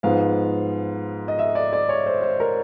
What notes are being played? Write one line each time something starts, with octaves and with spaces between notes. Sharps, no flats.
G#2 F3 G#3 B3 F5
D#5
E5
D5
D5
C#5
C5
C5
A#4